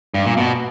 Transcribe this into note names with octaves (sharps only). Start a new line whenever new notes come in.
G2
A#2
B2